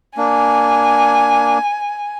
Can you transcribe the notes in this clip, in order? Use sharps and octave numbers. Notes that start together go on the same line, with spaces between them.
A#3 D4 G#5